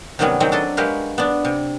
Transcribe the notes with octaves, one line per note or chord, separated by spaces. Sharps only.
C3 D#3 F#3 G3 B3 C#4
D#3 F#3 G#3 C4 D#4 E4
D4 A4 D#5
G#3 F#4 G4 A#4 B4 F5
B3 D4
C3